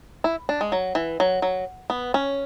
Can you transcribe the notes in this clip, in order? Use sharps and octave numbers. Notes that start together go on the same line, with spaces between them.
E4
D4
G#3
F#3
E3
F#3
F#3
B3
C#4